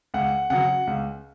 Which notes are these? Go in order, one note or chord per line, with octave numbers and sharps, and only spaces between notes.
C#2 F#5
C#3 F#3 F#5
C#2